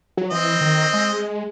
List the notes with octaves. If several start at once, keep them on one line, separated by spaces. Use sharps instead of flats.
F#3
E3 C4 D#5
D#3
G#3